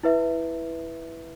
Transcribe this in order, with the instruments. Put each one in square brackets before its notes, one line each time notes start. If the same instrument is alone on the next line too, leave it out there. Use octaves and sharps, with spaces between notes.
[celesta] E4 B4 E5